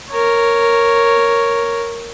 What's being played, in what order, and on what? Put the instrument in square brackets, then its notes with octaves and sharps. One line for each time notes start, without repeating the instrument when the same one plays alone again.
[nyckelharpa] A#4 C#5